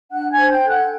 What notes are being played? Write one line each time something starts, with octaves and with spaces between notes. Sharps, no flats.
D4 F#5 F#6
G#5 G#6
C5
G5 G6
A4
F#5 F#6